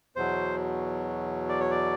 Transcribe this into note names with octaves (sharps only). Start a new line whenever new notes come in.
E2 B2 F#3 C5
D5
C#5
D5